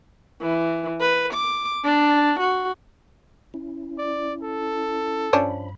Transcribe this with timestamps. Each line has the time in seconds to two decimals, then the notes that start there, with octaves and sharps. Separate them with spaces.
0.42 E3
1.01 B4
1.33 D6
1.84 D4
2.39 F#4
3.54 C#4 E4
3.98 D5
4.43 A4
5.33 G2 F3 C#4 D4 B5